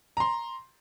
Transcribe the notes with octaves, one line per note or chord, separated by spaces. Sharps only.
A#5 C6